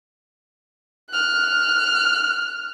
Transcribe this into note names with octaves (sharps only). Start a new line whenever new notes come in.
F6 F#6